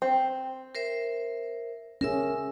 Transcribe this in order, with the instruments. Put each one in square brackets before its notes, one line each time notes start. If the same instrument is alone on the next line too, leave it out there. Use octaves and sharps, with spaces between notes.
[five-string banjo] C4
[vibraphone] A#4 C5 E5
[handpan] C#4 G#4 [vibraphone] A#4 E5 E6